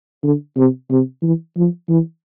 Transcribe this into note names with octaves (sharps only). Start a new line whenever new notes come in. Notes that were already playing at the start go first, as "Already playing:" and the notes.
D3
C3
C3
E3
F3
E3